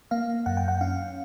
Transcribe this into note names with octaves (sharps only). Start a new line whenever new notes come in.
A#3 F5
F#2 F#5
G5
F#5
C#4 F5